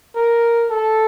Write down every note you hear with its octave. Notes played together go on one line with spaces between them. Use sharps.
A#4
A4